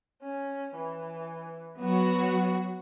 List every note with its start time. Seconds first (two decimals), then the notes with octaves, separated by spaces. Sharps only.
0.22 C#4
0.77 E3
1.79 F#3 B3 F#4